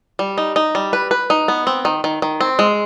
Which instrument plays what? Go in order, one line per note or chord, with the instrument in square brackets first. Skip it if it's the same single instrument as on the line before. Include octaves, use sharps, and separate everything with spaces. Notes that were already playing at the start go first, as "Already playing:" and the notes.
[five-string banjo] G3
D#4
D#4
G3
B4
B4
D#4
B3
C4
D#3
D#3
D#3
C4
G#3